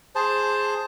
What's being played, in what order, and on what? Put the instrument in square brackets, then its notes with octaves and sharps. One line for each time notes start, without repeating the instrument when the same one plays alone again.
[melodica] G#4 C5 A5